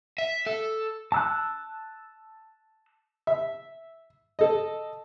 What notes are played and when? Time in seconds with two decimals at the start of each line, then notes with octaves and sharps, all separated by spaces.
0.18 E5
0.46 A4
1.12 A5 E6 F#6
3.27 E5
4.39 A4 D#5